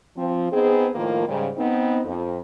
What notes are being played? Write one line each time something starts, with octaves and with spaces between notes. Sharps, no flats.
F3 C4
B3 C4 D#4 G#4
A2 D#3 F3 A#3 D#4 F4
G#2 C#3 G3
B3 C4 D#4
F2